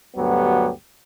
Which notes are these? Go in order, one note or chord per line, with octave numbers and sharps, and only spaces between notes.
D2 G2 F#3 B3 G4